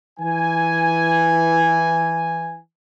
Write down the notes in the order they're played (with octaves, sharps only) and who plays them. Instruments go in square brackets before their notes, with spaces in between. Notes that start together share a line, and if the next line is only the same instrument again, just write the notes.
[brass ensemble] E3 G#5